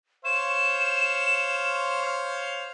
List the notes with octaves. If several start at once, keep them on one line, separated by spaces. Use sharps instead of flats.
C5 C#5 F5 E7